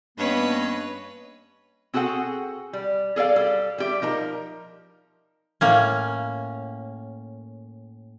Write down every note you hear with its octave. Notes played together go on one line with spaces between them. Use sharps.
G2 A#3 B3 C#4 B4 C#5 D#5
C4 F#4 G#4 A4 F#5
G3
G#4 A4 D5 F5
G3 A4
G3 G4 E5
F3 D#4 A#4
A2 A#3 C#4